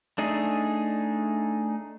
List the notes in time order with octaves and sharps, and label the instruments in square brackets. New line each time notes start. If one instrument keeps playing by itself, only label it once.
[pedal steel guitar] A3 D4 D#4 G#4